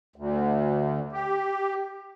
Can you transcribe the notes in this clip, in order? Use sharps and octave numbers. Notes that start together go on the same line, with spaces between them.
D2
G4